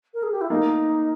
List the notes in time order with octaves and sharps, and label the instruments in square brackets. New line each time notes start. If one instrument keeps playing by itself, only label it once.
[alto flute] A#4
G#4
G4
E4
[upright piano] A#3 [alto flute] D#4